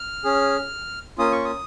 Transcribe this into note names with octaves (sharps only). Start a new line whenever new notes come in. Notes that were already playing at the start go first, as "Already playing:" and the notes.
Already playing: F6
C#4 G#4
A#3 C#4 F4 D#6
C#6
D#6